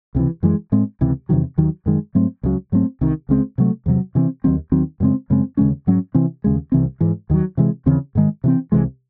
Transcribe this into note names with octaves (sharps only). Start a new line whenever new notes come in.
C#2 C3 E3
F#2 E3 G#3
A2 G#3 C4
C#2 C3 E3
E2 C3 D#3 F#3
D#2 D#3 F#3
F#2 D#3 G#3
G#2 F#3 A3 C4
C#2 C#3 F#3
G#2 F#3 A3 C4
C2 C3 D#3
C#2 C#3 G#3 C4
C3 F#3 A3
E2 C3 F#3
C3 E3 A3 C4
D#2 D#3 F#3 C4
D#2 D#3 F#3 C4
F#2 C#3 G#3 C4
F#2 C#3 G#3 C4
D#2 C#3 G#3 C#4
G#2 F#3 C#4
C3 E3 C4
D#2 C#3 G#3
C2 C3 E3 C4
G#2 E3 G#3
D#2 D#3 F#3
C3 E3 G#3
D#2 C#3 E3 C4
G#2 D#3 G#3
C3 E3 C4
C2 C3 E3 G#3